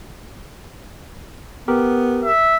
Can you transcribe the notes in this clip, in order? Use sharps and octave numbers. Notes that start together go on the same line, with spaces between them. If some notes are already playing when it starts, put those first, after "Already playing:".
B3 G4 A#4
E5